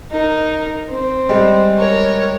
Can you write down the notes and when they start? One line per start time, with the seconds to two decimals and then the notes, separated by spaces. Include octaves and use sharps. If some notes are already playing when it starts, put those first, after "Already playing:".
0.11 D#4 A#4
0.89 C4
1.29 G3 G#3
1.78 A#4 C#5